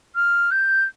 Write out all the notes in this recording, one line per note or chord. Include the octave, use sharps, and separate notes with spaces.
F6
G6